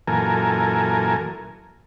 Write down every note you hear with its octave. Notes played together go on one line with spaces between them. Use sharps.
F#2 A#2 E3 A4 A#4 G#5